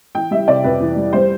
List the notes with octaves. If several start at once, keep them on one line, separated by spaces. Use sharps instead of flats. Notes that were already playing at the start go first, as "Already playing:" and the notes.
E3 G5
G3 E5
C3 D5
F2 B4
E3
G3
G3 C5